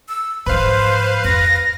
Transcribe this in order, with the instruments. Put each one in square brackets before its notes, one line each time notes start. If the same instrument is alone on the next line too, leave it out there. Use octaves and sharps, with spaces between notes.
[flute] E6
[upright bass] G#2 F3 [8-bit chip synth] B4 F5 [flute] C5
[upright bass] F2 [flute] A#6